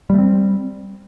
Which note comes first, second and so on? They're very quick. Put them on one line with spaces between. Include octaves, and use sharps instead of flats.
G3 A3 C4